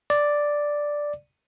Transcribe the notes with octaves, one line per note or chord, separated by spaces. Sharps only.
D5